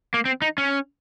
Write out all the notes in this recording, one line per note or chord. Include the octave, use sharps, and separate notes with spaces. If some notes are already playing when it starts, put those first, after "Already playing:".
A#3
C4
D#4
C#4